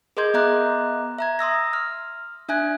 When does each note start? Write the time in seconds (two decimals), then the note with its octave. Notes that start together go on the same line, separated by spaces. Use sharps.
0.17 G#4 A#4 D#5 C6 G6 G#6
0.34 B3 D#5 E5 A#5 D6 F#6
1.18 E5 A#5 G#6
1.39 C6 D#6 E6 A#6
1.73 F6
2.49 D4 E5 G#5 F#6 G#6